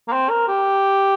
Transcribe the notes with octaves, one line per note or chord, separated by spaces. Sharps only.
A#3
C4
A#4
G4